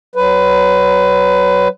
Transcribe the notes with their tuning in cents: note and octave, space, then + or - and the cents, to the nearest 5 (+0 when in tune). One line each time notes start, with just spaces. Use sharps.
F#3 +25 B4 +20